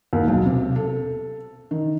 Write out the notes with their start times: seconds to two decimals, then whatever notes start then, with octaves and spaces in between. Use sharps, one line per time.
0.13 D#2
0.28 B1
0.45 C3
0.76 A4
1.71 D#3